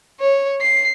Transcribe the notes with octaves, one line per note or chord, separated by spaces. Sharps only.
C#5
C7